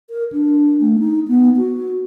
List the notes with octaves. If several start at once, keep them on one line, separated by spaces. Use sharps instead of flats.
A#4
D4
A3
D#4
B3
F#4